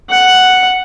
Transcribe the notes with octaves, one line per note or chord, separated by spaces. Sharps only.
F#5